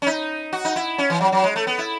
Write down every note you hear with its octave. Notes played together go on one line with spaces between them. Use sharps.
C#4
D#4
F#4
D#4
E4
C#4
E3
F#3
F#3
G#3
A3
B3
E4